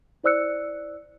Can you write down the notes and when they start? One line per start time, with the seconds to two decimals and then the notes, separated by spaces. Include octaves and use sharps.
0.24 E4 C5 D5 E6 F#6 C#7